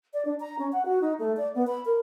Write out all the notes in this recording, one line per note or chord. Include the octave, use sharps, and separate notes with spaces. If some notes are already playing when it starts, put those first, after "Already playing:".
D5
D4
A#5
C#4
F#5
F#4
D#4
A3
D5
B3
B5
A#4